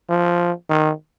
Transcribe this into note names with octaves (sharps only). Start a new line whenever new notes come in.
F3
D#3